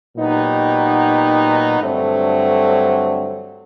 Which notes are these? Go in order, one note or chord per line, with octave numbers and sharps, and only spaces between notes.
A#2 F#3 B3 D#4 G4
G2 D3 F#3 A3 C4